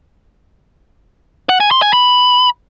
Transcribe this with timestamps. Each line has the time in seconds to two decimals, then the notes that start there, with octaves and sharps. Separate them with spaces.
1.49 F#5
1.60 G#5
1.71 C6
1.82 G#5
1.93 B5